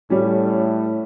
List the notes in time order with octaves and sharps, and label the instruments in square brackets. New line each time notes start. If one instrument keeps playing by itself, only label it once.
[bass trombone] A2 [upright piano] G3 C#4